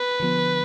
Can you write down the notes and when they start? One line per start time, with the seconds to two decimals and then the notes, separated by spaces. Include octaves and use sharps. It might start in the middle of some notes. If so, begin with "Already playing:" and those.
Already playing: B4
0.20 D3 F3 B3